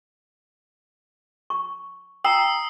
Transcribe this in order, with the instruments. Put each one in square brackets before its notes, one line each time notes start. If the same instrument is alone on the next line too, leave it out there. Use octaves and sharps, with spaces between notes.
[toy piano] C#6
[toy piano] G5 A#5 [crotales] D#6 E6 C7